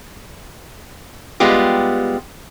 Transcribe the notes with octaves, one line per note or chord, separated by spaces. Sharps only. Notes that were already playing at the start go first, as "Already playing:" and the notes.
G3 G#3 B3 F4 G4